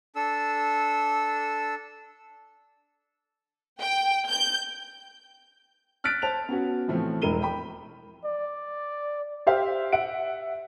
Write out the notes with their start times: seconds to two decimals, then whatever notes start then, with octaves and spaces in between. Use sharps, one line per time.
0.16 D4 A4 E6
3.81 G5
4.30 G6
6.04 F6 F#6 A6 B6 D7
6.22 C5 A5 F7
6.49 B3 C#4 F#4
6.88 A2 E3 F3 A3 C4
7.22 E1 E4 A#4 D#7 G7
7.42 G5 B5
8.25 D5
9.47 G4 C5 E5 F5 G5
9.93 E5 F#5 D7